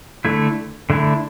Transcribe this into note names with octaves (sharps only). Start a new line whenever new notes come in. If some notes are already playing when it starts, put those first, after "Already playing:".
D3 A3 E4
D3 A3 E4